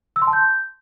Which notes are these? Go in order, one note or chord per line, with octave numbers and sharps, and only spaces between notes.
E6
C6
A5
G6